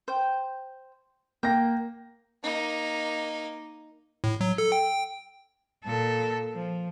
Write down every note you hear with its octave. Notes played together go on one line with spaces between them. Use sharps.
C5 G5
A#3 G5 A#6
A#3 D#4
A2
F#3
A4
G5
A#2 A4
F3